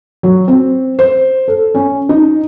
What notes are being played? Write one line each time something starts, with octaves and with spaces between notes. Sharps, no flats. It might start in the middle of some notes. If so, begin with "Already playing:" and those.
F#3
C4
C5
A4
C#4
D#4